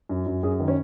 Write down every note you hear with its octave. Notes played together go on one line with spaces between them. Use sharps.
F#2
F#2
F#2 G#4
D#3
C#4